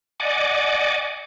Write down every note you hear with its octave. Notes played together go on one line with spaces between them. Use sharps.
D5 D#5 F#5 G#5 D6